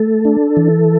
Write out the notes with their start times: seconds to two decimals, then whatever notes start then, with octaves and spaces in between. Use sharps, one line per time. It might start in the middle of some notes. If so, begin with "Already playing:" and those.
Already playing: A3 A4
0.25 D4
0.57 E3